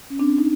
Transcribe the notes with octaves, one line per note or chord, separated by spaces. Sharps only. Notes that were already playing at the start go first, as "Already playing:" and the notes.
C#4
C4 D4
D#4